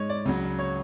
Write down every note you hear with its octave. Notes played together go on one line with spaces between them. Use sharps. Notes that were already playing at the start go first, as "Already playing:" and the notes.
Already playing: G#2 G#3 C#5
D5
C#2 C#3 F#3
C#5